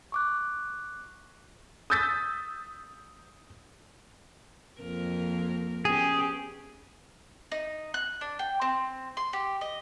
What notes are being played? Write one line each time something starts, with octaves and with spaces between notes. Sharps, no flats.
C#6 D6 F#6
D#6 E6 G6 A6 B6
F2 A#3 A#4
B3 C#4 G4 G#4
D#4
F#6
D4
G5
C4
C6
G4
D#5